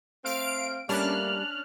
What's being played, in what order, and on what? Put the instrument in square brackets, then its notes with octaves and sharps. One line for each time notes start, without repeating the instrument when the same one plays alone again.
[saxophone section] A3 C4 [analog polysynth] F5 D7
[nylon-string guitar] G3 [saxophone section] A3 A#3 [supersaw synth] C#4 D4 A5 [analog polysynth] F6 F#6